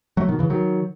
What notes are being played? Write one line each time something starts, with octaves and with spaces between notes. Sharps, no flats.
F#3 A3
B2 D#3
C#3 E3
D#3 F#3